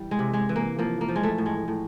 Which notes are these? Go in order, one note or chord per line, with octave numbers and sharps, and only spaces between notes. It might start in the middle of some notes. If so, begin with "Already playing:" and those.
Already playing: E3 G3
G#3
C3
G#3
E3
A#3
F3 A#3
A#3
F3
G#3
A3
A2
G#3
A2